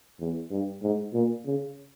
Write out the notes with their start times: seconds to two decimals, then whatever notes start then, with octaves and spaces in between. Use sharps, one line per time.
0.19 E2
0.51 G2
0.82 G#2
1.13 A#2
1.45 C#3